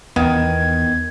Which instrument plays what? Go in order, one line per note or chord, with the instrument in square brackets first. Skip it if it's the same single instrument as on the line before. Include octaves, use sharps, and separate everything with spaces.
[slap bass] E2 [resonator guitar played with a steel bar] D#3 [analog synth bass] B3 [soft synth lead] G#6